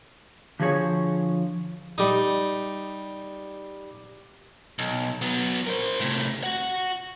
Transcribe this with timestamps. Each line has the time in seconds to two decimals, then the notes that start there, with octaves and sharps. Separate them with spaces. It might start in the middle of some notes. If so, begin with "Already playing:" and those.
0.60 D3 F3 F#4 G#4 C#5
1.98 G3 D#4
4.79 B1
5.22 F#3 B3
5.67 A#4 C5
6.00 A2 C3
6.44 F#4 F#5